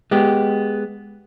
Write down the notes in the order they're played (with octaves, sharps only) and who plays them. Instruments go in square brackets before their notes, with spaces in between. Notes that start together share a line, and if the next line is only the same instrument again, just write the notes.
[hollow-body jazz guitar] G#3 B3 G4